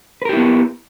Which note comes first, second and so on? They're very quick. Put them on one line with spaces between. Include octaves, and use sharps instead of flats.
B4 A#4 G4 E4 B3